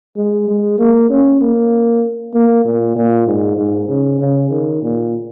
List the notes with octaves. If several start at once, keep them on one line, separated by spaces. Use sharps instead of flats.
G#3
G#3
A#3
C#4
A#3
A#3
A#2
A#2
G#2
G#2
C#3
C#3
D#3
A#2